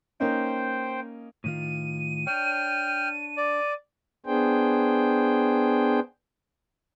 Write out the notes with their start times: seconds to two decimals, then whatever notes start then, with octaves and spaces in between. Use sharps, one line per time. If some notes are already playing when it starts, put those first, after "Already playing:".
0.20 A#3 C#4 D#4 C5 G5
1.44 A2 D#3 F4 D#7
2.27 D4 C#5 G5 F6
3.37 D5
4.26 B3 D4 G#4 C5 G5